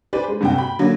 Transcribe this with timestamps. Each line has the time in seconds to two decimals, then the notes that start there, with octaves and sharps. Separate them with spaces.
0.13 G4 B4 C5 D5 G#5 B5
0.28 G#3
0.41 F#1 G2 C3 F#4 G5
0.56 G5 B5
0.79 D3 F#3 A#3